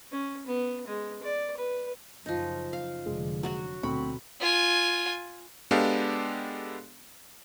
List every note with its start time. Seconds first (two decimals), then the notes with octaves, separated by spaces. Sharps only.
0.11 C#4
0.47 B3
0.87 G#3
1.23 D5
1.57 B4
2.26 F#2 C#3 F3 D#4
2.73 F5
3.06 F1 D3 G#3
3.43 F#3 F#4 F#5
3.83 D2 B2 C4 B5 C#6
4.40 F4 G#5
5.71 G#3 B3 D4 G4 A4 F5